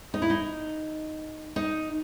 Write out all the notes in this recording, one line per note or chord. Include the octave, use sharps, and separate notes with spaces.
D#4
E4
D#4
D#4